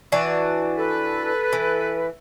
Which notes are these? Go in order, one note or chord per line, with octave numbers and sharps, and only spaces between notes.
E3 D4 F#4
A4 B4
E3